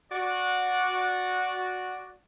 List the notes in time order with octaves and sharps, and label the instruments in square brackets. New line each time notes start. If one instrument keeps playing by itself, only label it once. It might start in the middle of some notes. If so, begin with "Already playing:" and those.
[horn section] F#4 D5